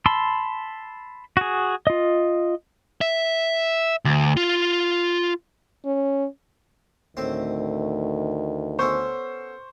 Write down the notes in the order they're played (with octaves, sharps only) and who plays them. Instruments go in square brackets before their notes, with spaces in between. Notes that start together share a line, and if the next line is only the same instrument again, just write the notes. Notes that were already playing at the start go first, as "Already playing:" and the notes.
[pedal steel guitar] A5 B5 C6 E6
F#4 G#4
F4 D#5
[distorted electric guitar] E5
D2
F4
[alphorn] C#4
[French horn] D2 [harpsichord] A2 C4 C5 [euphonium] D#3
[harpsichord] B3 C#4 A4 [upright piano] C5 C#6